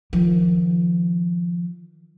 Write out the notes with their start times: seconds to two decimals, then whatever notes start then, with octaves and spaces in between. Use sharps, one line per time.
0.13 D#3 F3